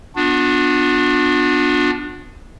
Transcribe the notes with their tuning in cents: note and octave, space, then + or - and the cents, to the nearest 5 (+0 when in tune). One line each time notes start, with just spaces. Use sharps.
B3 +0 D4 +0 F4 +45